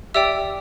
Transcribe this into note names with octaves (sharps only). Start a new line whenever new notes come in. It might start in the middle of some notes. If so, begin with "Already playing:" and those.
G4 D5 E5 G5 E6